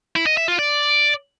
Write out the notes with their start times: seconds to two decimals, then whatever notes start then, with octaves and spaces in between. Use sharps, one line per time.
0.16 E4
0.26 D#5
0.37 E5
0.48 F4
0.59 D5